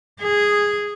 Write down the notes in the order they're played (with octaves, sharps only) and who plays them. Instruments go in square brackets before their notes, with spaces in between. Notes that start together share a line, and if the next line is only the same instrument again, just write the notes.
[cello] G#4